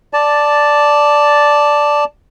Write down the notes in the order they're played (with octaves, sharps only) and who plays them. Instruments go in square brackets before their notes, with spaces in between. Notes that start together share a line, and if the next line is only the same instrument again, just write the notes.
[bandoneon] D5 A5